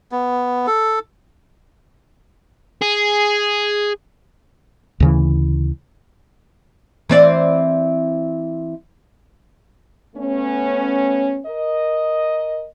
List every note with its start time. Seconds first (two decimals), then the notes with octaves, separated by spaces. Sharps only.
0.12 B3
0.67 A4
2.82 G#4
5.00 D2 C#3 E3
7.09 E3 C4 D5
10.16 A3 B3 C#4
11.47 A#4 D#5